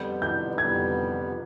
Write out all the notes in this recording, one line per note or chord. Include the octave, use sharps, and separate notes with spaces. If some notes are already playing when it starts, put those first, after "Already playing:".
Already playing: F2 D3 G3 B3 G6
G6
F2 D3 G3 B3 G#6